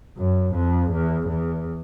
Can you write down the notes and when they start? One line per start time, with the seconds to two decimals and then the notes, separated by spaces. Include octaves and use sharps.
0.17 F#2
0.54 F2
0.91 E2
1.28 E2